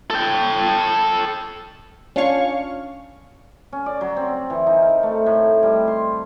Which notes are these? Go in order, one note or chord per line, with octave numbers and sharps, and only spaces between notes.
A4 G5
C#4 D4 F4 C#5 F5 C#6
C#4
D5
F#3
C4
E3
D#4
A#4
A3
A2
G3
C6